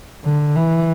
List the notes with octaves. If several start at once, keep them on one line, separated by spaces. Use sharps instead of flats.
D3
E3